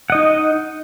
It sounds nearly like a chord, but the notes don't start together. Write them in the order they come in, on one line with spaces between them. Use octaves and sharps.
F#5 D#5 D#4